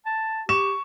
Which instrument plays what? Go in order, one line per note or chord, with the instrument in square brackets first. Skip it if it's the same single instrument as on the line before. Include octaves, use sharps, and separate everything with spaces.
[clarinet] A5
[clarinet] G4 [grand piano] C#6 E7